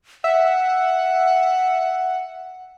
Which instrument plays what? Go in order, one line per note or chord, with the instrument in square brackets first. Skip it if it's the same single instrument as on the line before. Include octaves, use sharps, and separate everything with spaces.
[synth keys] E5 [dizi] F#5